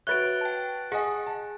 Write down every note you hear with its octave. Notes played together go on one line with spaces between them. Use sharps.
F#4 B4 C#5 E5 F#6 A6 D7 G7
G5 A5
G#4 D#5 F#5 G#5
A5